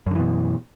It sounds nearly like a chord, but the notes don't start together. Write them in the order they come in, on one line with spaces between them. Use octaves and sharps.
F#2 D3 E3 B2